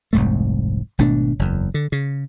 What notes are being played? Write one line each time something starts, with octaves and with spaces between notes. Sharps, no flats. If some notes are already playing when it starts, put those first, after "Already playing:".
F1 C2 G#2 A3
G#1 B2 A3 D4
F#1 E2
D3
C#3